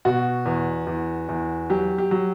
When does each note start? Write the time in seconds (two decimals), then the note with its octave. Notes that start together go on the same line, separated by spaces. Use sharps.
0.05 B2 F#4
0.46 E2
0.87 E2
1.29 E2
1.70 F#3 G4
1.98 G4
2.11 F#3